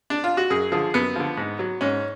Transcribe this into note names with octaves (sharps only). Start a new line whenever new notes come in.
D4
F4
F#4
F#2 G#4
D3 F3 G#4
F#2 B3
D3 F3
G#2
F#3
G#2 C#4